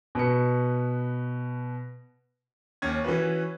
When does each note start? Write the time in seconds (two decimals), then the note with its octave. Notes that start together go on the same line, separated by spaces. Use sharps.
0.15 B2 B4 C#7
2.82 D#2 C#4 G#6
3.04 E3 C#4 F#4 B4